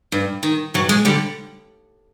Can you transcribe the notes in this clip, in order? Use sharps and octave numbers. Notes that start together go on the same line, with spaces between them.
G2
D#3
G2 F#3
G#3
D3 G3